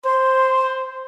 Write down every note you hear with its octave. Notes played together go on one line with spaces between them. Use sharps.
C5 C6